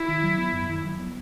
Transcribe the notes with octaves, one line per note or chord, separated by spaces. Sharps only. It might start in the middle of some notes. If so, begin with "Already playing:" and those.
Already playing: E4
D#3
F#3
B3
F#2
D#3
F#3
B3